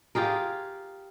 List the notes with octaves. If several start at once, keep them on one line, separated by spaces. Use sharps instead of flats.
F4 G4 G#4 A#4